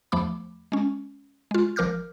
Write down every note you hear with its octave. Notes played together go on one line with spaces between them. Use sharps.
E2 F3 A3 B5 D6
G#3 C#4
G#3 F4
G#1 F3 A#4 D6 F6 G6